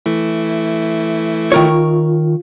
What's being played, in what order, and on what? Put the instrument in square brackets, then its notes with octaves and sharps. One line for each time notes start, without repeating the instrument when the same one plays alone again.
[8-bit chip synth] E3 A3 E4
[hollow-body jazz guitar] D#3 A#4 C#5 [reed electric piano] F4